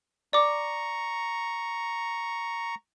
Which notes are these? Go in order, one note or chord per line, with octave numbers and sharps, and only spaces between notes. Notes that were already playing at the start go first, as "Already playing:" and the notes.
D5 A#5 C#6 D6